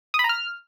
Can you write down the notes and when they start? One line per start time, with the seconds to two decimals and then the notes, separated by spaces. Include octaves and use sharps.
0.14 D#6
0.19 B5
0.24 A#5
0.29 F6